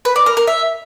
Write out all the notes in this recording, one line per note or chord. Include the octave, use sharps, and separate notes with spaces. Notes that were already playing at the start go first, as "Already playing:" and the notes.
B4
D5
A#4
A#4
E5